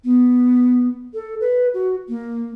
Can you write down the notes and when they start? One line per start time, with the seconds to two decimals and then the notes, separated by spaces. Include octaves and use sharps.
0.04 B3
1.14 A4
1.41 B4
1.74 F#4
2.09 A#3